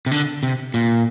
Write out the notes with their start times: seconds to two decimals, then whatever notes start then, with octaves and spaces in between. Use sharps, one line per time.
0.06 C3
0.11 D3
0.43 C3
0.74 A#2